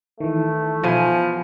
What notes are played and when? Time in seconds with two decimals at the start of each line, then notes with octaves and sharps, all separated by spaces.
0.20 D#3 E3 A3
0.83 B2 F3 G#5